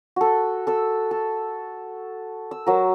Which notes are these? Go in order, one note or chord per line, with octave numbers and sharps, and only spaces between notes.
F#4 A4
A4 E6
A4
E6
F#3 A#4